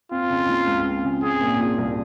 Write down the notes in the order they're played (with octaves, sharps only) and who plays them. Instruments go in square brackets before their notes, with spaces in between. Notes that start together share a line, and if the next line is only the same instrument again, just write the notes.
[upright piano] C4 [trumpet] F4
[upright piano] C#3
F3
C#2
C4
C#3
[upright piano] C4 [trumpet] G#4
[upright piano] A#2
F3
C2